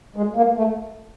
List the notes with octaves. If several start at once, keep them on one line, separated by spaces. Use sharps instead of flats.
G#3
A#3
A3